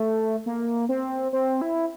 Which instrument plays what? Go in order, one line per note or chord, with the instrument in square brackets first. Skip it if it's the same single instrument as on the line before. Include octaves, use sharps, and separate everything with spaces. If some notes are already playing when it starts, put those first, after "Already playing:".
Already playing: [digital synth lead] A3
A#3
C4
C4
E4